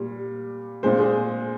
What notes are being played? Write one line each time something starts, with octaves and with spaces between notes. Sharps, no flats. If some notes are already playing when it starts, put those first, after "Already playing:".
Already playing: A#2 G3
A#2 G#3 C5
G#4